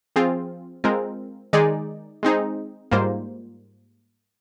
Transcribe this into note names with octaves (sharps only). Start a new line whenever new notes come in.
F3 C4 F4 G#4
G#3 C4 F4 A#4
D#3 G#3 D#4 G#4 D5
G#3 C4 D#4 G#4
G#2 G3 A#3 F4 C5